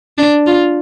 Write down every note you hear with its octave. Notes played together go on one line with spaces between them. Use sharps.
D4
F4